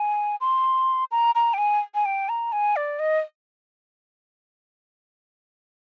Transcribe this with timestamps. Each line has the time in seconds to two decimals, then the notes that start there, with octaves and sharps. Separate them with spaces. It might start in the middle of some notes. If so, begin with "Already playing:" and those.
Already playing: G#5
0.41 C6
1.11 A#5
1.35 A#5
1.54 G5
1.58 G#5
1.95 G#5
2.05 G5
2.29 A#5
2.52 G#5
2.76 D5
2.99 D#5